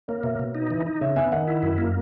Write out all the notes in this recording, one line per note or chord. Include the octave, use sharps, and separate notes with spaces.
A#3 A#4 C#5
B2 C#5 E5
B2
D#4
E3
D#4
C#3 C#5 E5
B3 E5 G#5
D#3 D#5 F#5
E4
F#2
A#3